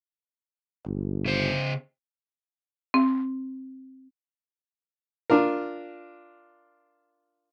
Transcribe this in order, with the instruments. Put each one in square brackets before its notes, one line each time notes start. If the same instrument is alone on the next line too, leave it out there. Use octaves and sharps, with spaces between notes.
[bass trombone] G1
[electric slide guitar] C#3 C5
[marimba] C4
[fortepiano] D4 F4 A#4